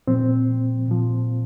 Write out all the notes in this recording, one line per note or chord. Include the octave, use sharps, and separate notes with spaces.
A#2 F3 C4
A#2 F3